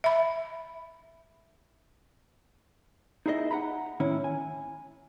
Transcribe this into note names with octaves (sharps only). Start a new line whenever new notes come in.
E5 B5
D#4 E4 G#4 C5 D#5 E5
F#5 G5 A#5 B5
A2 D#3 C#4 E4
G#5